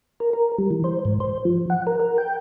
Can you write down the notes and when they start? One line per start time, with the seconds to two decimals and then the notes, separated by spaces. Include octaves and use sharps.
0.20 A#4
0.33 A#4
0.58 G3
0.71 E3
0.84 C5
1.05 G#2
1.20 C5
1.45 F3
1.70 F#5
1.87 A#4
2.00 A#4
2.18 G5